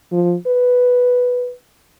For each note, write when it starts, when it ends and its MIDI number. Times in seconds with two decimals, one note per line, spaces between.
0.12 0.36 53
0.47 1.52 71